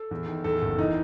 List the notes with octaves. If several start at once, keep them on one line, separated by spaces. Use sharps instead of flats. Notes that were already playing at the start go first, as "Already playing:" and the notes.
Already playing: A4
E2
D#3
E2 A4
F#1
E3 D#4